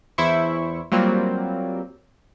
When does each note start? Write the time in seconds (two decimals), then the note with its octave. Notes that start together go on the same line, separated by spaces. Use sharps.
0.18 E2 E4 C5 C#6
0.92 F#3 G3 A#3 C4 F4